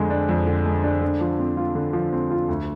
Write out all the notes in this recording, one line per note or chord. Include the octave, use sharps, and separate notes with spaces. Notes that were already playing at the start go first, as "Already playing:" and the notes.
Already playing: F2 D3 G#3
D4
F2
D3
G#3
D4
D3
F3
C4
F4
D3
F3
C4
F4
D2